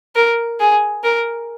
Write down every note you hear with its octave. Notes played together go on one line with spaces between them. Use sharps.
A#4
G#4
A#4